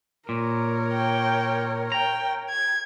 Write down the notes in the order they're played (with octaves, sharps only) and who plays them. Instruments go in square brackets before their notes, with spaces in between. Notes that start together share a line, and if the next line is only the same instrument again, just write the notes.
[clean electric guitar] A#2 [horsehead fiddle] A#4 C#5
[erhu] G5
[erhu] G5 [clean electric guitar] A#5
[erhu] G#6